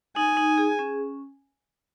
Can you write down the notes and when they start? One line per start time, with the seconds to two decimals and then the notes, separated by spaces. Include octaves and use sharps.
0.16 D#4 G#5
0.37 D#4
0.58 G#4
0.79 C#4